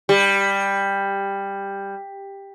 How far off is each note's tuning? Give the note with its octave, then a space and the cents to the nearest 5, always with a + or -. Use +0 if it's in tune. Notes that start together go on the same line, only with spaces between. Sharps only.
G3 +10